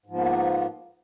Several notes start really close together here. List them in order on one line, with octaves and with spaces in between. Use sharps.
G#2 F3 B3 A#3